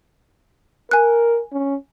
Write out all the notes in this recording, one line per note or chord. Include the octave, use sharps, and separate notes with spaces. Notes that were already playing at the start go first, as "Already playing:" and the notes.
A#4 G#5 F#6
C#4